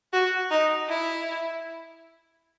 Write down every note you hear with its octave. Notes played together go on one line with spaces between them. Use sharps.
F#4
D#4
E4